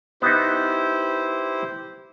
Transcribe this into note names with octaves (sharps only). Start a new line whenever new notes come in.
B3 D#4 E4 G4 C5